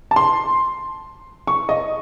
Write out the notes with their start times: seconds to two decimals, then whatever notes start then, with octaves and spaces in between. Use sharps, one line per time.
0.11 A5
0.16 C6
1.47 C#6
1.69 D#5